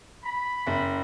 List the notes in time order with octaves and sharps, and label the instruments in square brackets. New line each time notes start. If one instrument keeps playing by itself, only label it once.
[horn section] B5
[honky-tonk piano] F#1